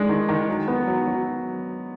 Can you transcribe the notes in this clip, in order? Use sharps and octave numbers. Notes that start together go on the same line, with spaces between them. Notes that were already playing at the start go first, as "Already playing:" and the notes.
Already playing: G#3 D4
D#3
D#3
F#3
B3
F#3
F#3